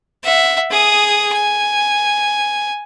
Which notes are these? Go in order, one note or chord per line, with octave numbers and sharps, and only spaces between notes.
E5 F#5
G#4 D#6
G#5